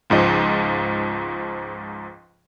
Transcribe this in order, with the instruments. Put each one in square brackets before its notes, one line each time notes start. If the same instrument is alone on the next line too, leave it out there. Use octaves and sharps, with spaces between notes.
[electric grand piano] C#2 G#2 F3 D#5